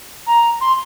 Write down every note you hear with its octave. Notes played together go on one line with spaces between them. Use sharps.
A#5
C6